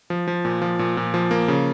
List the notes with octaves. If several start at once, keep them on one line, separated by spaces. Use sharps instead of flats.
F3
F3
A#2
F3
A#2
A#2
F3
A#3
C#3